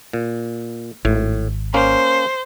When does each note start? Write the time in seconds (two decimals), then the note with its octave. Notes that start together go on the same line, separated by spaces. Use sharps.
0.13 A#2
1.05 G#1 A2
1.74 A#3 C#4 C5